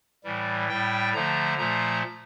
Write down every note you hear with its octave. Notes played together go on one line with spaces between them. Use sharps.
A2 E3 G3
A2 G3 G5
D3 F3 A3 A#5
A#2 F3 A3 A#5